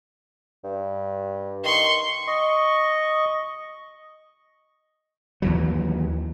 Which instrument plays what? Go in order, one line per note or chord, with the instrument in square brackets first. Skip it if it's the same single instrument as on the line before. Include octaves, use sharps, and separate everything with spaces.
[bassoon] G2
[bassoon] D#3 [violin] C6 C#6
[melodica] D#5 C#6
[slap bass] D#2 E3 F#3